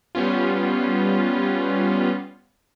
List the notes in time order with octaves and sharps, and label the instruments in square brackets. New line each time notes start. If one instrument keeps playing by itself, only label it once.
[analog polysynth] G3 B3 C#4 F4